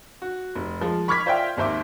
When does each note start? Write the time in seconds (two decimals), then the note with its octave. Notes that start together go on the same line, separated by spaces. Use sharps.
0.22 F#4
0.55 F1
0.81 F3 G#3
1.08 B5 C#6 D6 F6 G#6 B6
1.26 F4 C5 D5 E5 G5
1.57 G#1 D#2 C5 E5 D6